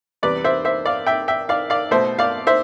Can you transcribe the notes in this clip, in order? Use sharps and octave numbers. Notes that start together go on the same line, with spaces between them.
E2 C3 G3 B4 D5
C5 E5
C5 E5
D5 F5
E5 G5
E5 G5
D5 F5
D5 F5
B2 A3 C5 E5
D5 F5
C5 E5